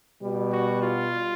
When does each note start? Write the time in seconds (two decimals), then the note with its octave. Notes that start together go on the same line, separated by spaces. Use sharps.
0.21 B2 G3
0.52 F#4
0.82 F4